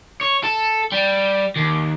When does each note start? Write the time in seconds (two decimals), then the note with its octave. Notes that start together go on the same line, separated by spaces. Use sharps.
0.21 C#5
0.44 A4
0.92 G3
1.56 D#2